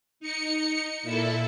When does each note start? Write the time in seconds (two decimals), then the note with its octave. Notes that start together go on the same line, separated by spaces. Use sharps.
0.20 D#4 C#7
1.03 A#2 E4 A4